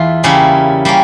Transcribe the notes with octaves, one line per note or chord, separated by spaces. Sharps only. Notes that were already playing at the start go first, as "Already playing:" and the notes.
Already playing: E2 E3 F4
C#3 G3 A#3 C#4 E4
G3 A#3 C#4